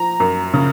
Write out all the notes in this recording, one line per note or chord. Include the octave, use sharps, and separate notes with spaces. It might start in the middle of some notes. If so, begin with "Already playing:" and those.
Already playing: F3 A#5
F#2
C#3